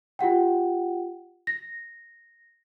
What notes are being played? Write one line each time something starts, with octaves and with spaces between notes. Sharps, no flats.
F4 G4 F#5 G5
A#6